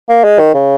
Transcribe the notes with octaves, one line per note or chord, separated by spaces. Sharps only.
A#3
G#3
D#3
C#3